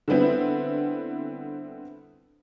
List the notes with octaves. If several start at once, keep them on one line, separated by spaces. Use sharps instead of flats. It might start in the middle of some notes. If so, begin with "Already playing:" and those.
D3 G3 B3 C4 E4